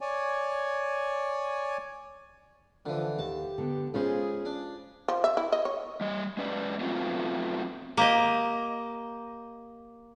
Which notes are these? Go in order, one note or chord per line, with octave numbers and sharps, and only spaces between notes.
C#5 D5 G#5
D3 E3 F3
D#2 G4 A5
D3 B3
C#3 G#3 F4 G#4 C5
D4
F3
E5
E4
D#5
C#5
G3 D#5
G#3 C#4 B4 D5
F#3 A3 B3 C4 F4
A#3 G4 D#5